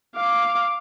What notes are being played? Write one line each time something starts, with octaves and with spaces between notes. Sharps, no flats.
F5 D6